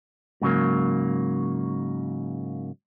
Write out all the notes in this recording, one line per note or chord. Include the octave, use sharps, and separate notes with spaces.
G#2 C#3 F#3 A#3